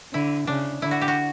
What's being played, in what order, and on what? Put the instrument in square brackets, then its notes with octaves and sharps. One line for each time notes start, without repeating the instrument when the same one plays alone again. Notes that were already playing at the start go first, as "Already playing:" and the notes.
[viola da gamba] D3 [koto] E4
[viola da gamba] C#3 [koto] D4
[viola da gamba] D3 [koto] E4
[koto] F#4
G4
F#4